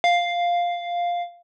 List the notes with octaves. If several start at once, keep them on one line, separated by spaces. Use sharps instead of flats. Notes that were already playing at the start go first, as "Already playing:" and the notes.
F5